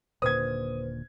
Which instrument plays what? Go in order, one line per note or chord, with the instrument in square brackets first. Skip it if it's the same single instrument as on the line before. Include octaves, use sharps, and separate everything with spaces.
[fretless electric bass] D#1 A#2 D3 [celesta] B4 C5 [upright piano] D#6 G#6